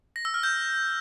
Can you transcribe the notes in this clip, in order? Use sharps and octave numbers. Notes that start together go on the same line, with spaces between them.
A#6
E6
F6
G6